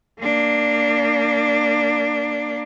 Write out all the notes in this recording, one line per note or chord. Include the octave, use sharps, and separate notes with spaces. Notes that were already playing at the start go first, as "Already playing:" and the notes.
A#3 D4